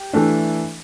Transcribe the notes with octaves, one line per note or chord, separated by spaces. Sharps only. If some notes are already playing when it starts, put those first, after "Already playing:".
Already playing: G4
E3 A3 D4